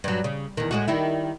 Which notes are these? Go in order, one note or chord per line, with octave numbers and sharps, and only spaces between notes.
G2 F#3
C#3
E2 D#3
A2 G#3 F#4
D#3 G3 E4